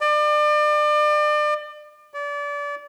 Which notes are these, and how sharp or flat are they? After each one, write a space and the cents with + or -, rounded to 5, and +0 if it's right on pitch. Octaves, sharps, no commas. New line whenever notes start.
D5 +35
D5 -30